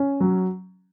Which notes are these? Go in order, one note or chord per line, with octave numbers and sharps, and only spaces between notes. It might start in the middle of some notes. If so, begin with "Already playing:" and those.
Already playing: C#4
F#3